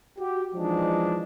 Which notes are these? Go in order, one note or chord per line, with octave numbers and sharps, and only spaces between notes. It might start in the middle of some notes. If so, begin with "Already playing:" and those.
F#4 G4
E3 F3 G#3 D4 D#4